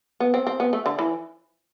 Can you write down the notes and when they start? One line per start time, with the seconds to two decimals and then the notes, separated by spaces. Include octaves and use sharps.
0.20 B3
0.34 C4
0.47 C4
0.60 B3
0.73 A3
0.86 D3
0.99 E3